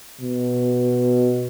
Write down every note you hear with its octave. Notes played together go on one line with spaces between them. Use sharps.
B2